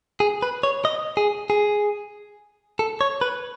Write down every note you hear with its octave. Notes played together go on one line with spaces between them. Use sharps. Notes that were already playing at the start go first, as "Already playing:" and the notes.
G#4
B4
C#5
D#5
G#4
G#4
A4
C#5
B4